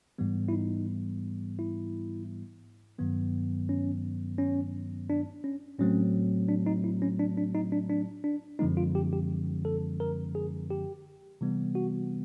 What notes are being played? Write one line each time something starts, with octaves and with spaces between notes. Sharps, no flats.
G#2 E3 G3 B3
E4
D#4
E4
G2 D#3 F#3 B3
C#4
C#4
D4
C#4
A2 F#3 A3 C4 C#4
D4
D#4
E4
C#4
D4
D4
D#4
D4
D4
D4
F#2 D3 F3 G#3 C4 D#4
F4
G4
G4
A4
A#4
G#4
G4
C3 E3 G3 B3
F#4